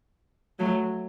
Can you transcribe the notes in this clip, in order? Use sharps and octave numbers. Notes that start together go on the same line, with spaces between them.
F#3 A3